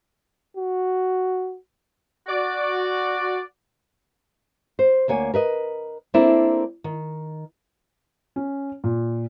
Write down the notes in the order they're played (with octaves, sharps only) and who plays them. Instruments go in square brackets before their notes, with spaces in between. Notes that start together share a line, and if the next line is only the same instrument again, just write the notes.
[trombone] F#4
[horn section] F#4 D5
[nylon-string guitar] C5
D2 A#3 C#5 G#5
A#4 B4 D#5
A#3 C4 D4 E4 A4 A#4
D#3
[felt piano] C#4
A#2